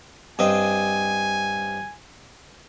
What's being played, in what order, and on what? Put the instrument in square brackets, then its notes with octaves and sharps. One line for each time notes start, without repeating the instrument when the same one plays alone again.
[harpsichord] G2 C4 D#5 [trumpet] G#5